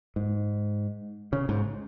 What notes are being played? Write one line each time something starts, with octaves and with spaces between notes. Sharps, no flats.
G#2
C#3
G#2